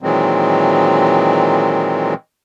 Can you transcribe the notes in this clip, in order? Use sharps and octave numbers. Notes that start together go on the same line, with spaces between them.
A#2 D#3 E3 F#3 G#3 C4